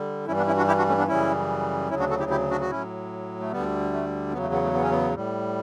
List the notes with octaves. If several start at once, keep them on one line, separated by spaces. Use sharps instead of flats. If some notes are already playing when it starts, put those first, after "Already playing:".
Already playing: D3 G3
G2 E3 G3 C#4 E4
B3 D4
C#4 E4
D4 F#4
E4 G4
D4 F#4
A3 C#4
B3 D4
F#2 C#3 E3 G3 C#4 E4
D2 C#3 F#3 C#4 E4
D4 F#4
F#4 A4
E4 G4
E4 G4
D4 F#4
F#4
A2 F#3 C#4 E4
A3
D2 D3 G3 B3
A3
E2 C#3 F#3 B3
A3
B3
A3
B3
C#4
B3
A2 G3